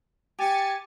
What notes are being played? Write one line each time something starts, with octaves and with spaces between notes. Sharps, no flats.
G4 G#5 A6 C#7